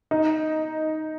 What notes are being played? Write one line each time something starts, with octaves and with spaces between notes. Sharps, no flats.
D#4